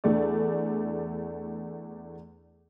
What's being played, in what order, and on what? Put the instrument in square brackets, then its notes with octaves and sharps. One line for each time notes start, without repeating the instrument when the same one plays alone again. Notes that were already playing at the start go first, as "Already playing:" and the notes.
[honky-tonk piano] E2 A3 D4 A4 D5